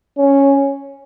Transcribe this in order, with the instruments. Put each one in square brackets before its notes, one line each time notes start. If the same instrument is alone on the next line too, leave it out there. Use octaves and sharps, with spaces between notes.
[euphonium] C#4